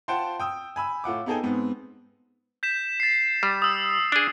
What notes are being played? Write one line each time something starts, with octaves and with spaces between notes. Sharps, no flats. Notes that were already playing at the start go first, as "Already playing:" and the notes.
F4 C5 F#5 G5 A5 C6
G5 D#6 E6
G#5 B5 E6
A2 F4 F#5 D6
B3 D#4 G#4 A4 G5 G#5
G#2 B3 C4
G6 B6 E7
A6 C7
G3
D#6 E6
D4 G#4